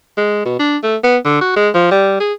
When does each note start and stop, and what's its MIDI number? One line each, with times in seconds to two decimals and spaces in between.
0.18 0.42 56
0.46 0.59 47
0.59 0.77 62
0.83 0.96 57
1.03 1.17 59
1.25 1.40 50
1.41 1.55 66
1.56 1.69 56
1.75 1.90 53
1.91 2.18 55
2.20 2.33 68